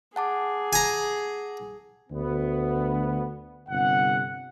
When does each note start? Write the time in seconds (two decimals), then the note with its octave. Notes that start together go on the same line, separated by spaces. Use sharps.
0.16 G#4 F#5 A5 D6
0.73 G#5 A#5
2.10 D2 B3
3.69 G1 C3 F#5